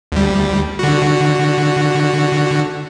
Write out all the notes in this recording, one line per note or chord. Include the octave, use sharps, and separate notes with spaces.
D2 G3
D3 F#4